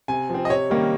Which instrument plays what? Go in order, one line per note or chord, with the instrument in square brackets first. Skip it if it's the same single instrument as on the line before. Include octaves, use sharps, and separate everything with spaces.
[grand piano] C3 G#5
F3 C4
D#5
C3 C#5
D#3 G3 A#3 C#4